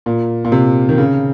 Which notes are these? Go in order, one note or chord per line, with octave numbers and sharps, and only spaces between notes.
A#2
A#2
C3
D#3
C#3